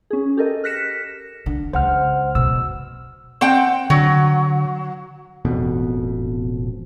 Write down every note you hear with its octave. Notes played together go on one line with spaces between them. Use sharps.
C#4 G#4
G4 A4 A#4 D#5
F6 F#6 A#6 B6 C#7 E7
D3
C#2 C5 F#5 F6
B2 E6
C4 F#5 G5
D3 F#3
E1 A1 F2 B2